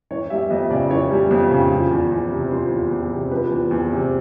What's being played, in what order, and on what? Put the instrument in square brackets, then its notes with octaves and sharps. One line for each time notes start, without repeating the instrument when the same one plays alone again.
[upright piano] E3 C#5
G3 E5
F2 D#5
C#3 D5
E3 C#5
G3
F2
C#3
F3
E2
E2
C3
F3 C5
E2
E2
C3
F3 B4
E2
E2
C3